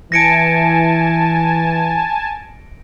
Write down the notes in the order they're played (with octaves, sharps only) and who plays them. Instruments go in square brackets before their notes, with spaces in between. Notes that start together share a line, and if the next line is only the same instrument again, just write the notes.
[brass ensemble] E3 [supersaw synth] G#5 A5 [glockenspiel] A#6 C#7 D7